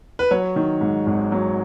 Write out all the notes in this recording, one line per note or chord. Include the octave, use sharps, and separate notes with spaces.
B4
F#3 C#5
D#3
G#2
G#1
F#3